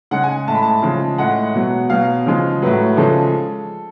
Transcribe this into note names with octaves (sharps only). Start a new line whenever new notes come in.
C#3 G#3 F#5
G#5
A2 G#3 A5 B5
A5
C#3 F3 G#3
A2 G#3 F#5
B2 F#3
B2 F#3 F5
C#3 F3 G#3
A2 F#3 B4
C#3 F3 G#3 A4